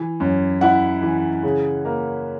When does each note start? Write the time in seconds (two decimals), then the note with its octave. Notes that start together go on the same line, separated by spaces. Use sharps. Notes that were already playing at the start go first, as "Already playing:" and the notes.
Already playing: E3
0.20 F#2
0.61 E4 F#5
1.02 E3
1.43 C#3
1.85 A#3